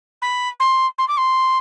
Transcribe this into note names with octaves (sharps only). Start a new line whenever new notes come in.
B5
C6
C6
D6
C6